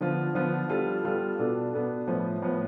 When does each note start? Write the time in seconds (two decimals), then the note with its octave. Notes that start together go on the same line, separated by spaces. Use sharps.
0.01 D3 F3 B3 F4
0.35 D3 F3 B3 F4
0.69 G3 B3 F4 A4
1.04 G3 B3 F4 A4
1.39 B2 B3 D4 A4
1.74 B2 B3 D4 A4
2.07 A2 F3 B3
2.42 A2 F3 B3